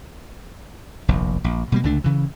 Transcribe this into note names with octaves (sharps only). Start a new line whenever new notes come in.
F1 A#1 D#2
A#1
B2 G3 A#3
C#2 D3 A3 D4
C#3 E3